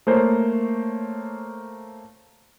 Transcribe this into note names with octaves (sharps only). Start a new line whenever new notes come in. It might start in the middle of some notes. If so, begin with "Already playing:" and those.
A3 A#3 C5 C#5